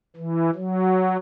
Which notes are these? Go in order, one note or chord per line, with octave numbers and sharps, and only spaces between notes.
E3
F#3